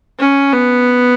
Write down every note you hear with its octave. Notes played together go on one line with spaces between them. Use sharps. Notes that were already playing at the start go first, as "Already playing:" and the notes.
C#4
B3